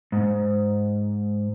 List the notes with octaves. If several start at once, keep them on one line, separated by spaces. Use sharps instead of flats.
G#2